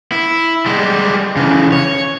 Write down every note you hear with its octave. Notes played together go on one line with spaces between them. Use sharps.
E4
G3 G#3
C#3 E3
C#5